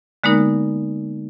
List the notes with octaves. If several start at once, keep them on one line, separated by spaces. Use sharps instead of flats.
D3 G#3 A#3 B3 D#4 A#4